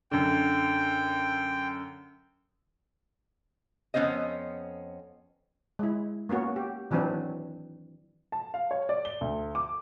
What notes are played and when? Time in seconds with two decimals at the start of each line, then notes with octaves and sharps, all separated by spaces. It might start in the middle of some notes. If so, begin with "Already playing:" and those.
0.11 F#2 D3 G5
3.94 F2 D#3 B3 C#4 C5 D#5
5.79 G#3 E4
6.29 A#3 B3 C#4 F#4
6.56 G4
6.91 D#3 E3 F#3 C4 D4 E4
8.32 A5
8.54 F5
8.71 C#5
8.89 D5
9.05 G7
9.21 D2
9.55 D6